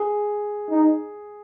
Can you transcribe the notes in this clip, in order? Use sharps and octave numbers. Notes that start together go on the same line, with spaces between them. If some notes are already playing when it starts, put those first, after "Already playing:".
Already playing: G#4
D#4